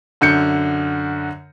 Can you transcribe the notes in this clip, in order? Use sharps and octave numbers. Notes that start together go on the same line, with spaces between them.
F#2 D3 G6 C#7